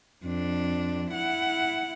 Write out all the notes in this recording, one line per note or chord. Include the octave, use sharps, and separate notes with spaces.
F2 D4
E4 F#5